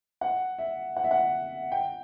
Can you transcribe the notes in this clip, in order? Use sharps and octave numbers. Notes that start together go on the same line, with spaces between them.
F#5
E5
F#5
E5
F#5
G5